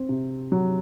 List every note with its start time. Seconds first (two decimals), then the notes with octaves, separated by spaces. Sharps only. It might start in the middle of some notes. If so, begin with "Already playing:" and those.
Already playing: C4
0.09 C3
0.52 F#3